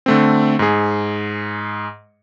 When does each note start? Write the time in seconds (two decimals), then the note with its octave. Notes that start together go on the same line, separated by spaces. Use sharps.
0.06 D3 A3 C4
0.59 G#2 G#4